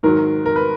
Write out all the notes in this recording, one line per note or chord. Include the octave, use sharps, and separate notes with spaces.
G#2 D#3 F#3 A#4
A#4
B4